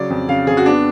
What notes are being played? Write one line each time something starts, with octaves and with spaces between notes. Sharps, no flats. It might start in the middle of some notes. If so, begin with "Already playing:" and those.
Already playing: C#3 F#3 D5
F2
C#3 F5
F2 G#4
F#4
B3 D4